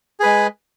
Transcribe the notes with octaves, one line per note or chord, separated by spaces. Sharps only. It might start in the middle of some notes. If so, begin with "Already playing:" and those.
G#3 G#4 B4